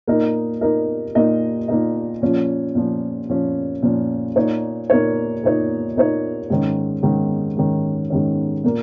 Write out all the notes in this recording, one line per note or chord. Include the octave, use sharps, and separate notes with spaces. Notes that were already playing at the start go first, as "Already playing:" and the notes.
A#2 A#3 D#4 A#4 D#5
A#2 A#3 D#4 A#4 D#5
A#2 A#3 D#4 A#4 D#5
A#2 A#3 D#4 A#4 D#5
A#2 F3 C#4
A#2 F3 C#4
A#2 F3 C#4
A#2 F3 C#4
A#2 A#3 D#4 C#5
A#2 A#3 D#4 C#5
A#2 A#3 D#4 C#5
A#2 A#3 D#4 C#5
G#2 D#3 C#4
G#2 D#3 C#4
G#2 D#3 C#4
G#2 D#3 C#4
A#2 A#3